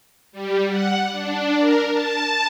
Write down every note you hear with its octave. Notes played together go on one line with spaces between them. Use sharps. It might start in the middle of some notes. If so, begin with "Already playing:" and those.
G3
F#5
D4
A#4
A5